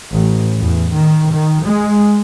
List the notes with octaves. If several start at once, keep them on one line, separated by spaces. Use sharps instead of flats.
A1
E2
D#3
D#3
G#3